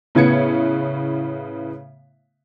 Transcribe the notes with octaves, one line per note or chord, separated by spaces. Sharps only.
A2 C#3 B3 G#6 C#7